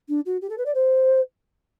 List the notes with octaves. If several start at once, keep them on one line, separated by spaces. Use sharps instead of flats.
D4
F#4
G4
A4
B4
D5
C5